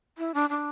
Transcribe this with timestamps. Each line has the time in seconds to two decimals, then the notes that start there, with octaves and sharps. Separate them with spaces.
0.18 E4
0.34 D4
0.50 D4